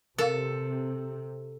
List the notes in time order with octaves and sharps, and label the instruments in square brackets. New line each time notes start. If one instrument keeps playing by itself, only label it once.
[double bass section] C3 [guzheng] A4 [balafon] A#4 F5